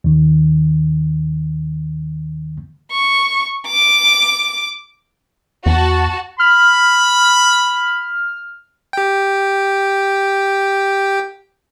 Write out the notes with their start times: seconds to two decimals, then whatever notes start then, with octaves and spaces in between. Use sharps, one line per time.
0.04 D#2 D#3
2.92 C#6
3.67 D6
5.66 E2 F#4 A5
6.40 B5 F6
8.93 G4 G5